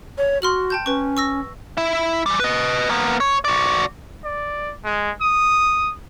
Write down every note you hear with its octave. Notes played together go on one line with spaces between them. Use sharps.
C#5
F#4 C6 F6 F#7
G5 A5 G6
C#4 B4 C#6
C#6 E6 A#6
E4 E5
E3 G3
B4 D#5
A#3 B3
C#5
F#4 D5
D5
G#3
D#6